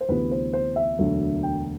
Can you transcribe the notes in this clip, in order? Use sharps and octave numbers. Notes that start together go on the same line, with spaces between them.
C5
D2 C3 E3 B3 B4
C5
C5
E5
E1 D2 D3 F#3
G5